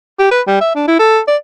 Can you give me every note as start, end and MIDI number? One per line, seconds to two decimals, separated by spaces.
0.19 0.31 67
0.31 0.41 71
0.47 0.60 55
0.60 0.74 76
0.75 0.85 62
0.88 0.98 64
0.99 1.20 69
1.27 1.36 74